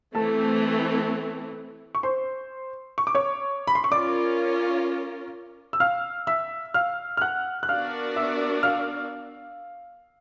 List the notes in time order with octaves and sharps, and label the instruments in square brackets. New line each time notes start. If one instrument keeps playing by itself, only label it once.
[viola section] E3 A3 C4 [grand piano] A4 A5
[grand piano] C#6
C5 C6
C#6
D6
C#5 C#6
B5
C6
C#6
[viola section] C#4 F4 A#4 [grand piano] D5 D6
[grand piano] E6
F5 F6
E5 E6
F5 F6
F6
F#5 F#6
F#6
[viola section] B3 D4 F#4 A#4 D5 [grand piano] F5 F6
[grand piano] E5 E6
F5 F6